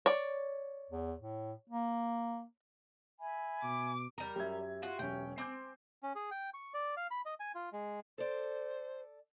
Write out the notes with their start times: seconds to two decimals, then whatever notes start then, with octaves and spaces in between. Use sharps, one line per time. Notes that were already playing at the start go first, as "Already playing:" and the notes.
0.06 C#5 D5
0.91 E2
1.20 A2
1.70 A#3
3.20 E5 G#5 B5
3.64 B2 D6
4.18 E2 G3 A#4
4.36 F#2 G4 E5 G#6
4.82 F4 F#4
4.99 E1 F#3 C#4 G5
5.38 C4 G#5 D6 G6
6.03 C#4
6.15 G#4
6.31 G5
6.54 C#6
6.74 D5
6.97 F5
7.11 B5
7.26 D#5
7.40 G#5
7.55 F4
7.72 G#3
8.18 A4 C5 D5